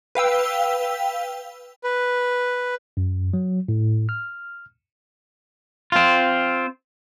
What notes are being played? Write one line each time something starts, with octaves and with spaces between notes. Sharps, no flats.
B4 F5 G5 E6
B4
F#2
F#3
A2
F6
C4 F4